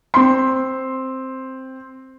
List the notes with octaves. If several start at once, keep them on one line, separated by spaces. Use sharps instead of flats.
C4 C6